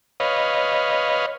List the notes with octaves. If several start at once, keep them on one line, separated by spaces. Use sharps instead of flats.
B4 C#5 D#5 F5